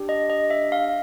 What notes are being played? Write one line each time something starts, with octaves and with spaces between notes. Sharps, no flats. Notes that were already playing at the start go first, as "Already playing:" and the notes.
Already playing: D4 G4
D#5
D#5
E5
F5